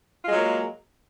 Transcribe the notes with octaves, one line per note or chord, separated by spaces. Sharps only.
F#3 G#3 A#3 F4